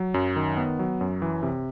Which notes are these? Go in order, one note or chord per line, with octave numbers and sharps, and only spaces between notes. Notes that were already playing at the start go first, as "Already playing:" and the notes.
Already playing: F#3
F#2
D#3
B3
F#3
F#2
E3
C3